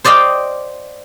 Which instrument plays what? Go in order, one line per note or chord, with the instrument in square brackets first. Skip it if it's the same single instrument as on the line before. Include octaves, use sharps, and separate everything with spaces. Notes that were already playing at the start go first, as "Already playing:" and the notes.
[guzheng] C5 D5 D#5 F5 G5